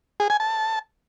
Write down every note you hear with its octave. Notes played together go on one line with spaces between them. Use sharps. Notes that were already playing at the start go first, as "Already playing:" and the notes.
G#4
G#5
A5